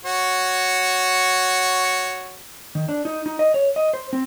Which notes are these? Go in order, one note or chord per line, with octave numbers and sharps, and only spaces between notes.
F#4 C#5
D#3
D4
D#4
D#4
D#5
C#5
D#5
C5
C4